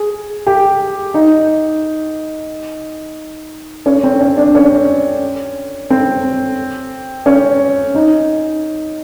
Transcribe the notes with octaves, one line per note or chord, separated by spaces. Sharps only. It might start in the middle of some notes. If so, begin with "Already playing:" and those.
Already playing: G#4
G4
D#4
C#4
C4
C#4
D4
C#4
C4
C#4
D#4